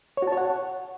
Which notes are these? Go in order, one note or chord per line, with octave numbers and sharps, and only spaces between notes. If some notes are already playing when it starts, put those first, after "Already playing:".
C#5
F#4
A5
C#5
F#5